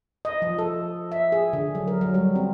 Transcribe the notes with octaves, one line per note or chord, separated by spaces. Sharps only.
D#5
F3
A4
E5
G#4
D3
F#3
A#4
F#3
G3
C4